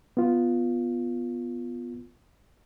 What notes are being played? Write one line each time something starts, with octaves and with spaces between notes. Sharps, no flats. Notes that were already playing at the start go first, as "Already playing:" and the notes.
B3 F4